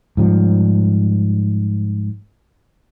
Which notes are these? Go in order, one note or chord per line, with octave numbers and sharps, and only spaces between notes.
G#2 F3 G3